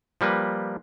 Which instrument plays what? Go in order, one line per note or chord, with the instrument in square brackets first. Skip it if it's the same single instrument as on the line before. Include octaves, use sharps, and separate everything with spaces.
[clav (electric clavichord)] F3 G3 A#3 B4